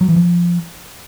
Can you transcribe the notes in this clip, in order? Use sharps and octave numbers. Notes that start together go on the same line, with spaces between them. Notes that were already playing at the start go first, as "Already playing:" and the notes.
F#3
E3
F3